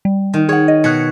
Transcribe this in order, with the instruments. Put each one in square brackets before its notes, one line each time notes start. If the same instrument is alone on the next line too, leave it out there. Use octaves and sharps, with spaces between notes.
[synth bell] G3
[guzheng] D#3
[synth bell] G#4 F#5 [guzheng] C#5
[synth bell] D#5
[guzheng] B2 [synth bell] F#6 G#6 C#7